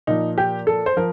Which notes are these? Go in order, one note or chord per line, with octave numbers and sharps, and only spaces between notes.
A#2 F3 D#4
G4
A4
C5
F3 A#4